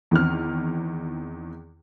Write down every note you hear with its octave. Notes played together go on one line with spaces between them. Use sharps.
E2 D#3 C4 F6